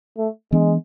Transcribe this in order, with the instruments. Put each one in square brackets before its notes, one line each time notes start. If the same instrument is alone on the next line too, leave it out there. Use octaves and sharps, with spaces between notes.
[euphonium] A3
[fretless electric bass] E3 B3 D4 [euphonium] G#3